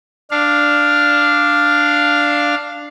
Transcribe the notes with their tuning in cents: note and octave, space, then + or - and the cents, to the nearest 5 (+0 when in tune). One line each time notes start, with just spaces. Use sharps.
D4 +0 F5 +0